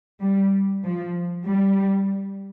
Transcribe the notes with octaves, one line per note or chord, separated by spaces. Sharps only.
G3
F3
G3